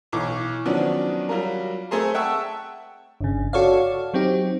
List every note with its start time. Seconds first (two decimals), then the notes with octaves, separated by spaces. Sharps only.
0.13 B1 E3 C#6 D6
0.65 D#3 F3 F#3 B3 C#4 D4
1.29 F#3 G3 F4 A#4
1.91 A3 C4 G#4 A#4 C5
2.14 E5 F#5 G5 A5 C#6 E6
3.21 G1 C#3
3.53 F#4 A4 C#5 D5 F5
4.14 F#3 C4 D#4 G4